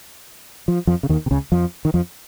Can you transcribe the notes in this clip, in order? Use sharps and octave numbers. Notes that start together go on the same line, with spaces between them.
F3
F2 F3
C#3
D#2 D#3
C3
C#2 C#3
F2 F3
D#3
F2 F3